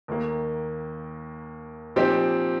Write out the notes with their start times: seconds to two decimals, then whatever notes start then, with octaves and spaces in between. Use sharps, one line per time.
0.08 D#2 D#3 A#3
1.96 A#2 F3 C4 D#4 G4